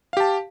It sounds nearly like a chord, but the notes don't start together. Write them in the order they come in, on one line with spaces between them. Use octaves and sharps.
F5 G4 A5